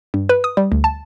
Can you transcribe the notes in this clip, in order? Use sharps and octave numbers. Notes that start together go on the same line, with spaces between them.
G2
B4
D#6
G3
D2
A5